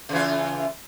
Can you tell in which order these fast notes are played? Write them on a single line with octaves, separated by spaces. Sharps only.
C#3 E3 F4